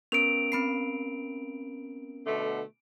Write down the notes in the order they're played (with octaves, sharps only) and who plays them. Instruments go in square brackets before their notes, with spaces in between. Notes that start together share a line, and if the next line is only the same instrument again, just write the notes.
[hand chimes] B3 C#4 A#4 [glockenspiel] D7 F7
[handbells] C4 B5 C7
[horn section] B2 D3 A3